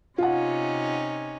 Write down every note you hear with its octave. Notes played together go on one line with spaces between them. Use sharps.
C3 C#4 D#4 F4 F#5